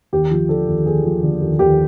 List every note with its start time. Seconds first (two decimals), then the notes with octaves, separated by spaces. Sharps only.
0.13 D#2 G4
0.31 F3
0.49 D3 A4
0.67 D#2
0.86 D#2 G#4
1.04 F3
1.22 D3
1.41 D#2
1.59 D#2 G4